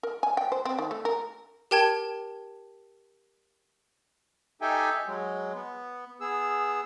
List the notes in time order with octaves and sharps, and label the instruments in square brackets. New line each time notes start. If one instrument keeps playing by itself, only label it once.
[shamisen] A#4
G#5
G5
C5
C4
D#3
A3
A#4
[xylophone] G4 A#4 G5 A5 G#6
[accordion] D#4 G4 A4 E5 G5 G#5
F#3 G#3
B3
B3 G#4 E6